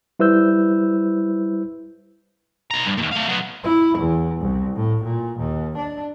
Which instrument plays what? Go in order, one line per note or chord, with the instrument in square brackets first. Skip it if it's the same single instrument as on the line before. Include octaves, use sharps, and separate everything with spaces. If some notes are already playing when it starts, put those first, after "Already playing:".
[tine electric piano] G3 E4 B4 C5 E6 G6
[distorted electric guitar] B1 A#5
G2
D#2 A#2
A3 F5
F#3 B3
[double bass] E4
E2
C2
A2
A#2
D#2
D4